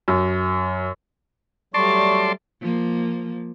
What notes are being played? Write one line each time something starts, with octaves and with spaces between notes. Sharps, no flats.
F#2
F#3 G3 A3 D5 A5 C6 C#6
F3 A#3